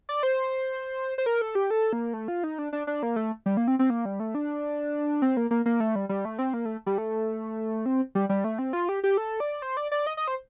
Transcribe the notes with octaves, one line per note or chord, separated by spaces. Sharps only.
D5
C5
C5
A#4
A4
G4
A4
A#3
A3
F4
D#4
D4
D4
D4
A#3
A3
G3
A#3
C4
C4
A#3
G3
A3
D4
C4
A#3
A#3
A#3
A3
G3
G3
A3
C4
A#3
A3
G3
A3
C4
G3
G3
A3
C4
F4
G4
G4
A4
D5
C5
D5
D5
D#5
D#5
C5